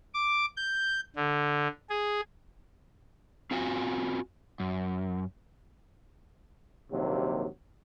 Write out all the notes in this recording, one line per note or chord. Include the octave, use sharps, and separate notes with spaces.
D6
G6
D3
G#4
C4 F4 F#4 G#5
F#2
A#1 D#2 C3 F#3